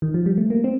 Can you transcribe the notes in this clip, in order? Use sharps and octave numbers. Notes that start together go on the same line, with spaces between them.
D#3
F3
G3
A3
A#3
C4